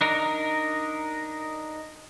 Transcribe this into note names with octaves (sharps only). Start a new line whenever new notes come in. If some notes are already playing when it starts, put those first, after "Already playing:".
D4 D#4 A#4